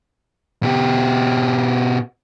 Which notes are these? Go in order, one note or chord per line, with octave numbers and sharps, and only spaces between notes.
B2 G4